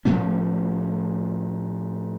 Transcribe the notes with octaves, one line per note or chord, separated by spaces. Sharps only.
A2 F3 A3 C#4